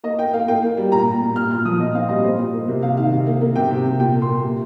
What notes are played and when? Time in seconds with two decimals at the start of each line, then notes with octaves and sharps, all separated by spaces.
0.04 A#3 D#5
0.19 A#3 G5
0.33 A#3 F5
0.48 A#3 G5
0.62 A#3
0.77 G3
0.92 A#2 A#5
1.06 A#2
1.21 A#2
1.36 A#2 F6
1.51 A#2 F6
1.65 F3 D#6
1.80 A#2 D#5
1.94 C4 F5
2.09 G3 D#5
2.24 A#2 C5
2.39 A#2
2.53 A#3
2.68 C3
2.82 C3 F5
2.97 D#3 F5
3.12 C3
3.27 A#3
3.41 A#3
3.56 C3 G5
3.71 C3
3.85 C3
4.00 A#2 G5
4.14 A#3
4.22 C6
4.29 A#2
4.43 C3